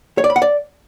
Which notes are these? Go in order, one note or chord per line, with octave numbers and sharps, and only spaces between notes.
C#5
D5
B5
F#5
D5